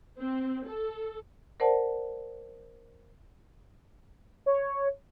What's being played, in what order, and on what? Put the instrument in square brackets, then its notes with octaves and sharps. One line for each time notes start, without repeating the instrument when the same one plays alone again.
[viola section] C4
A4
[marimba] A#4 C5 D5 F#5 A5
[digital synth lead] C#5